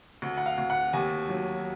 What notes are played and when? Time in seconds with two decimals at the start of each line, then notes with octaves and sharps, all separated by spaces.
0.22 D2
0.38 F#5
0.46 F5
0.58 D2
0.70 F#5
0.93 D#2 G#5
1.29 F#3